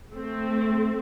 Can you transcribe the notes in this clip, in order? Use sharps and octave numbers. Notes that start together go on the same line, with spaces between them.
A3 C4